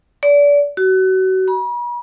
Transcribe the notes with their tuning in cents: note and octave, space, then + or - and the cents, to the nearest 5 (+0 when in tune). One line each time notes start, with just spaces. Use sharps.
D5 -30
F#4 +30
B5 -45